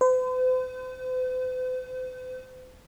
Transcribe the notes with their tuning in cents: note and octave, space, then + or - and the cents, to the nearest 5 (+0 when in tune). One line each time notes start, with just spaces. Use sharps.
C5 -45